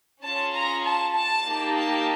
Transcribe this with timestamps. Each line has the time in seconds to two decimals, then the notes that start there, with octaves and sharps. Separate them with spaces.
0.23 C#4 F4 G#4 A5
0.54 A#5
0.85 A5
1.16 A5
1.46 A#3 D#4 G4
1.77 A5